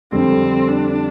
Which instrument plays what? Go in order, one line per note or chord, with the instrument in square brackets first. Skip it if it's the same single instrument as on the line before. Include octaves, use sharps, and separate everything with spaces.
[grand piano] F2 D3 G3 [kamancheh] C4
[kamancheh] D4